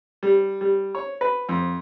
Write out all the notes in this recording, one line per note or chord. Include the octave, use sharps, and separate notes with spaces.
G3
G3
C#5
B4
F2